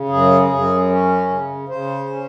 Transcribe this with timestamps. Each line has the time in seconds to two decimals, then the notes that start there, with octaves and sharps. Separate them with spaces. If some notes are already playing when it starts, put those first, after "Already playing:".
Already playing: C#3
0.09 F#2 G#4
0.48 F#2 G#4
0.89 C#4
1.29 C#3
1.68 C#3 C5
2.09 C#4